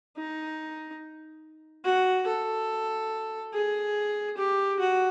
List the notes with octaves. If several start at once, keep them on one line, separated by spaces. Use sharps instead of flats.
D#4
F#4
A4
G#4
G4
F#4